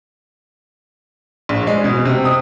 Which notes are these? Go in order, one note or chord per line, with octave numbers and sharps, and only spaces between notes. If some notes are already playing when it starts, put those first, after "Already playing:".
A#1
G#3
B2
C3
D#6